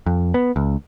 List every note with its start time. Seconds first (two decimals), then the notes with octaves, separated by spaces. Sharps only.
0.06 F2
0.34 B3
0.56 C#2